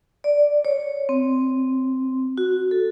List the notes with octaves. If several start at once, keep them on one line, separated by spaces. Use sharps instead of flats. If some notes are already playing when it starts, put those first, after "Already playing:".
D5
C#5
C4
F#4
A4